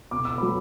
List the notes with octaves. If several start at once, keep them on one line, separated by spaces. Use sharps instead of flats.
B2 D6
E6
F#3 B5 D6